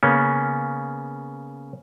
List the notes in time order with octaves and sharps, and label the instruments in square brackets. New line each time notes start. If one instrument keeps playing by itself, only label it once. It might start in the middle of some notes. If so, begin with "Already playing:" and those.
[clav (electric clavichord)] C#3 A#3 B3 C#4